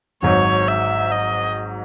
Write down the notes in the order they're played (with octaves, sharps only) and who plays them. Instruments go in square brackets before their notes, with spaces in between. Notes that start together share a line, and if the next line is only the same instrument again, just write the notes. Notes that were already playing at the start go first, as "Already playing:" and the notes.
[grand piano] G#1 G#2 F#3 [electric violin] C#5
[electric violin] E5
D#5